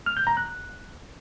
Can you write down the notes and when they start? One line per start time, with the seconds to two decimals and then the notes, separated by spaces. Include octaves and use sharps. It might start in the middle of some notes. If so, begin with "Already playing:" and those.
0.06 F6
0.17 G6
0.27 A#5
0.37 F#6